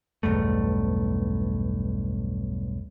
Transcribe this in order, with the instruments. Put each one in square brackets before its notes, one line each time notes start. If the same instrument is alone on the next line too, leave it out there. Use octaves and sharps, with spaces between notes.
[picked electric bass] B1 E2 G2 A3